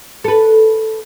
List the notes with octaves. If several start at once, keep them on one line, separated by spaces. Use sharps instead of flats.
A4 B4